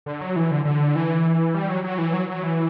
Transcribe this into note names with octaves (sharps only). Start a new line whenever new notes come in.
D3
F#3
E3
D3
D3
E3
G3
F#3
F#3
E3
F#3
F#3
E3